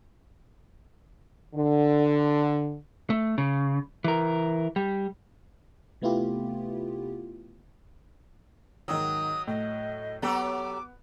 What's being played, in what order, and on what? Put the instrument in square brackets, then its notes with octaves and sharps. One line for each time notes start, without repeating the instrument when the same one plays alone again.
[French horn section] D3
[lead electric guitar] A3
C#3
E3 A#4
G3
[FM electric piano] C3 A3 B3 E4 F4 G4
[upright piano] G#2 D#3 E6 [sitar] F#3 [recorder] D#6
[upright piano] A2 [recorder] D#5
[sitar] F#3 G4 A4 [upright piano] B3 [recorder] D6